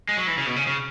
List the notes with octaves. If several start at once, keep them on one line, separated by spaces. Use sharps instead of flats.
G#3
F#3
E3
C#3
B2
C#3
C#3